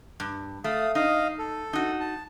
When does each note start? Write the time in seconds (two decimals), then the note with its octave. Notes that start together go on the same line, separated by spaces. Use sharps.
0.20 G2
0.64 A3 F5 D#6
0.95 D#4 D#5 F5
1.39 A4
1.73 D#4 F#4
2.00 A5